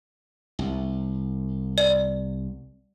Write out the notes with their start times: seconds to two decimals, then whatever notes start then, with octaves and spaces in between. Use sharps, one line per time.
0.59 C2
1.78 D5